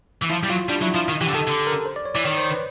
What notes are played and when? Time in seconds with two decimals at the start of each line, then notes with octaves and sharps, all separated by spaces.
0.22 E3
0.30 F3 E4
0.43 G3
0.49 F#3 F4
0.69 G3 D4
0.82 F#3 E4
0.95 F3 F4
1.09 D#3
1.21 E3 G4
1.28 D3
1.34 D#3 A4
1.47 D3
1.67 A#4
1.86 C5
1.96 D5
2.05 C#5
2.15 E3 D5
2.25 D#3 C#5
2.38 C5
2.51 B4